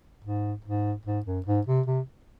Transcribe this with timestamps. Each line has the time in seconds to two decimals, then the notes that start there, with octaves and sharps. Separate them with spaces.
0.25 G#2
0.65 G#2
1.06 G#2
1.26 F#2
1.47 G#2
1.67 C3
1.86 C3